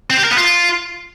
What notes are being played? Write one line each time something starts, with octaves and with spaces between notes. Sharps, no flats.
C4
G4
A#4
B3
F4